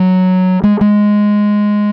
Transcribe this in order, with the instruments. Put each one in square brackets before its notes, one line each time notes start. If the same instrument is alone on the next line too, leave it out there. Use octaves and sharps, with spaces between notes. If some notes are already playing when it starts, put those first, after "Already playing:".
Already playing: [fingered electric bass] F#3
G#3
G#3